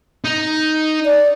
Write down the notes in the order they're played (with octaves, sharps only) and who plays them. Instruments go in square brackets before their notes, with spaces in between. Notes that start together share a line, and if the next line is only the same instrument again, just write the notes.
[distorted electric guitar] D#4
[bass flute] D5